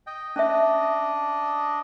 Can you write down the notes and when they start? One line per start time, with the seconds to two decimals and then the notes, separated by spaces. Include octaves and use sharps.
0.07 D#5 G5
0.36 C#4 D4 D#5 E5